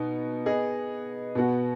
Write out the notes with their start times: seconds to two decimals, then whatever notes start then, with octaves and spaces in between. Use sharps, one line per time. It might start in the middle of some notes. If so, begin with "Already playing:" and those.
Already playing: B2 B3 D#4
0.46 B3 G#4 D#5
1.35 B2 B3 F#4